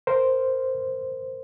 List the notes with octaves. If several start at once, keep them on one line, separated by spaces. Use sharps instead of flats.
A#4 C5